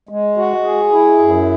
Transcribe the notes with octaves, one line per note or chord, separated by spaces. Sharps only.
G#3
F#4
G#4
E4
F#2